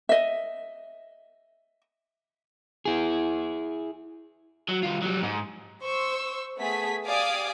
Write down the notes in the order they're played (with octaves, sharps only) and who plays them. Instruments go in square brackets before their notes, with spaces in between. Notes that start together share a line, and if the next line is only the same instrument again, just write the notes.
[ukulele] D#5 E5
[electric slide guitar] E4 G#4
[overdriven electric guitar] F#3
G3 F4
F#3 G3
G#2
[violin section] C5 C#6 E6
A3 B3 G#4 B6
G4 D5 F5 G#5 D6 D#6